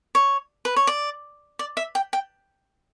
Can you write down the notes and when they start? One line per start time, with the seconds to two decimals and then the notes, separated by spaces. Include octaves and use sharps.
0.15 C#5
0.65 B4
0.76 C#5
0.87 D5
1.59 D5
1.77 E5
1.95 G5
2.13 G5